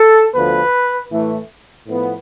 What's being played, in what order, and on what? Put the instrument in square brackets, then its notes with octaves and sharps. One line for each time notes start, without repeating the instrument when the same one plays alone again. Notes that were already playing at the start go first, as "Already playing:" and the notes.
Already playing: [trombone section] A4
D2 D3 F3 B3 B4
A2 E3 A3
A2 F3 B3